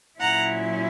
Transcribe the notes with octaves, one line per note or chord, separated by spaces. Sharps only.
A#2 F#3 C#4 E4 F#5 A#5